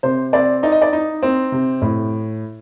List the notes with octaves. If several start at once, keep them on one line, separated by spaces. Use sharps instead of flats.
C3 C5
C4 D5
D#4 D5
D#5
D5
D#4
C4
C3
A2